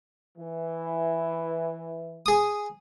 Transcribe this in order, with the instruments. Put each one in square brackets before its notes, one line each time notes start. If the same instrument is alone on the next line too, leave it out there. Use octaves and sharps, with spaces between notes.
[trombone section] E3
[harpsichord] G#4 D#6